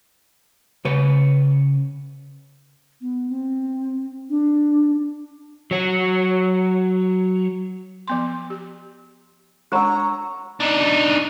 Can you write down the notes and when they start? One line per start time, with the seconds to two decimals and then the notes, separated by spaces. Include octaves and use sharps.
0.85 C#3 B4 C#5
3.01 B3
3.29 C4
4.29 D4
5.71 F#3 C#5
8.08 F3 B3 C6
8.50 G4
9.72 G#3 D4 C#5 F#5 A#5 E6
10.60 D4 D#4